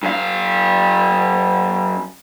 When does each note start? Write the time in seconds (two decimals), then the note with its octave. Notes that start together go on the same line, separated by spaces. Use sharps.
0.03 F#2 F5